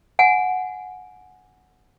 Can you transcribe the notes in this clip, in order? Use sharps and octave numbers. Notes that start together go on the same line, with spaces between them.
F#5 G#5